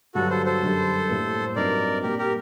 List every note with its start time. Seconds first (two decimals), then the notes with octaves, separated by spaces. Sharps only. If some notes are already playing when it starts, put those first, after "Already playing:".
0.15 G2 D3 F#3 F#4 A4
0.30 A4 C5
0.46 A4 C5
0.62 F#2 D3 G3
1.08 A2 G3 A#3
1.56 G2 F#3 C4 D#4 A#4 D5
2.03 A#2 G3 A#3 G4 A#4
2.18 G4 A#4